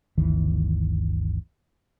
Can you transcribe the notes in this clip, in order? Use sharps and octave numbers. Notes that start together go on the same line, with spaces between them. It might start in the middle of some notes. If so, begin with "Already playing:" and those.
G1 D2 D#3 E3